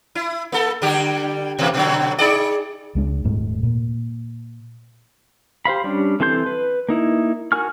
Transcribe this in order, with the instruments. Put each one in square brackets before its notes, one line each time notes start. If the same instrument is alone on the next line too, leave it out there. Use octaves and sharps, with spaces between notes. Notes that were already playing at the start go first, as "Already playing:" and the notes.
[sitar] E4
A#3 A4
D3 G3 G4
B2 E3 A#3
B2 D3 F#3
D#4 G#4 D5
[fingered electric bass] C#2 G#3 D4
D#1 G#2 A3
A#2
[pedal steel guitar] G4 C5 F5 B5
G3 C#4 D4
E3 C4 A4 C6 G6
B4
A#3 D#4 E4
F#4 A#4 G#5 C#6 F6